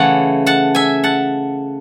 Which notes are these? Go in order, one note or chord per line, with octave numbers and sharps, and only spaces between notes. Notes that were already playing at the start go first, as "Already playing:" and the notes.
Already playing: C#3 E3 A3 F#5 A5
F#5 A5
E5 G#5
F#5 A5